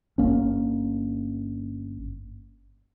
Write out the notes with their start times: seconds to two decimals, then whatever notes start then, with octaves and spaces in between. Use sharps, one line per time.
0.18 G1 A#3 C#4